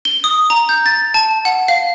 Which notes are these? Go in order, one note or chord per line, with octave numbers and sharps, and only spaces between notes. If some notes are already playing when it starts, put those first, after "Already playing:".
G7
D#6
A#5
G6
A6
A5
F#5
F5